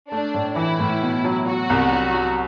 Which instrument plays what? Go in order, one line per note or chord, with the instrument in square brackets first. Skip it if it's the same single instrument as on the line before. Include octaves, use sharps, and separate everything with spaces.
[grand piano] A3 [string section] D4
[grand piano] A2
[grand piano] E3 [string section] E4
[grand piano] A2
B2
F#3
[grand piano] F#3 [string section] F#4
[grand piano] C2
F#3
F#3